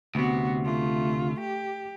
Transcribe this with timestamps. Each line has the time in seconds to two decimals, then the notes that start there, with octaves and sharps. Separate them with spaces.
0.15 D2 C3 B3 F#4
0.65 A3 F4
1.41 G4